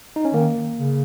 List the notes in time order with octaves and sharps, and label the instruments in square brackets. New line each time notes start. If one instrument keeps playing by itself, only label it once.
[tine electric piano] D#4
C#4
[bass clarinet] D#3 [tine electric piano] A#3
[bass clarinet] C#3